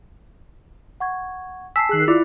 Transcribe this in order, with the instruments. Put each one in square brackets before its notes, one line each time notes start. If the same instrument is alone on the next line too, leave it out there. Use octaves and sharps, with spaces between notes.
[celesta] F#5 C#6 G#6
[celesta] G#5 A5 C7 [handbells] E6 B6
[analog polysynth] D#3 F#6 C7 [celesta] G#4
[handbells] E4 [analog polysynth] F4 D5 [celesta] D6